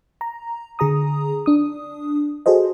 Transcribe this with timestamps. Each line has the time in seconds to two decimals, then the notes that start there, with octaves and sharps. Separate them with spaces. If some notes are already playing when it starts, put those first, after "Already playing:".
0.21 A#5
0.79 D3 G#4 A#5 D#6
1.46 D4 D#6
2.46 F#4 G#4 A4 C5 D#5